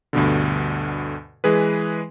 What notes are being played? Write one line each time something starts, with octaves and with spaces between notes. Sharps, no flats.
D2 G2 B2 D3
E3 G#3 G#4 B4